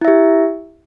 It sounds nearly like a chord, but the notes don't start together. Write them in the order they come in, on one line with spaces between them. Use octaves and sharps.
E4 E5 G4